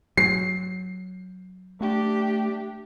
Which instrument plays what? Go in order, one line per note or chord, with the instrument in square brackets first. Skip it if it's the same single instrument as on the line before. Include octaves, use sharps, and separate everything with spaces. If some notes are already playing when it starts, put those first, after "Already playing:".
[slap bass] F#3 [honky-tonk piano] C7
[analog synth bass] A3 [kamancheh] D4 G4